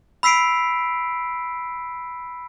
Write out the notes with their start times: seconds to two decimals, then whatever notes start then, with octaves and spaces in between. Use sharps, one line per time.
0.23 B5 E6 B6 C7 D7